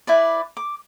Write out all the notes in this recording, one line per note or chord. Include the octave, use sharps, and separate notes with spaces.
E4 B4 D5
D6